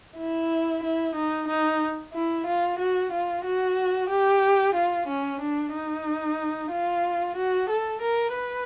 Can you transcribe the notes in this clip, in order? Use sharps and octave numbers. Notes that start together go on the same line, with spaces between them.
E4
E4
D#4
D#4
E4
F4
F#4
F4
F#4
G4
F4
C#4
D4
D#4
F4
F#4
A4
A#4
B4